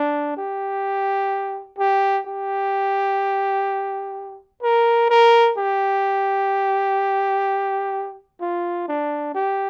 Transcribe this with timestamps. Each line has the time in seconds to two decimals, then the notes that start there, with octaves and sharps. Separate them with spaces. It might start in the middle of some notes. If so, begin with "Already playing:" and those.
Already playing: D4
0.37 G4
1.79 G4
2.27 G4
4.63 A#4
5.10 A#4
5.58 G4
8.41 F4
8.88 D4
9.35 G4